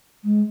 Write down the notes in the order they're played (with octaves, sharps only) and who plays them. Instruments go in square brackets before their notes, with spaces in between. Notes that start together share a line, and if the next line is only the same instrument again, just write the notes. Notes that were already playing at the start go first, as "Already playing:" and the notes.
[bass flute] G#3